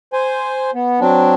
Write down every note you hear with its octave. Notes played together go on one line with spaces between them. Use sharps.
C5 G#5
B3
F#3 C4 D4